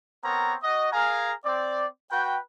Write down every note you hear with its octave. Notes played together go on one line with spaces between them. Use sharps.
B3 C4 A#4 C#5 A#5
F#4 D#5
G#4 A#4 F5 G#5 A#5
C4 D5
F#4 B4 G5